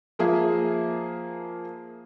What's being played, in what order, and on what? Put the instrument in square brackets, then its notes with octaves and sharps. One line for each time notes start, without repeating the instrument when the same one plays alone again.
[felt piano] F3 A#3 G#4 E5